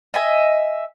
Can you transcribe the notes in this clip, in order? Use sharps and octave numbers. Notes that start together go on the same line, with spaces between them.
D#5 E5 G#5